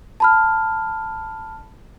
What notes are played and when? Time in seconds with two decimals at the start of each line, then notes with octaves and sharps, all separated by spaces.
0.20 A5 B5 F6